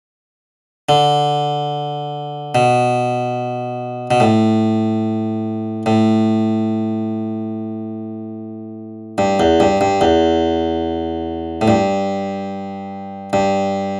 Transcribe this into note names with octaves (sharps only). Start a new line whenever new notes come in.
D3
B2
B2
A2
A2
G2
E2
G2
G2
E2
A2
G2
G2